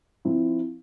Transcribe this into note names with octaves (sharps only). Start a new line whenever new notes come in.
F3 C4 E4